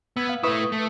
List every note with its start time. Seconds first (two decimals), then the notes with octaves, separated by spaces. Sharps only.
0.17 B3 E6 G#6
0.29 F5
0.43 A3 E4 B4 C#6 D#6
0.72 A3